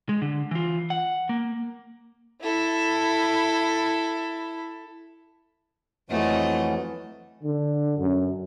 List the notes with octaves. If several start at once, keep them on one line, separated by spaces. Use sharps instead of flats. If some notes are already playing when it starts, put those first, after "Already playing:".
G#3
D3
E3 F4
F#5
A#3
E4 A4
F2 E3 F#3 A3 D#5
D3
F#2